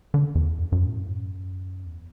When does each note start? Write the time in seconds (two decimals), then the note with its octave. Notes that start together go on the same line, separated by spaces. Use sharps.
0.14 D3
0.35 E2
0.58 F#2
0.72 F#2
0.87 A2
1.00 F#2
1.86 E2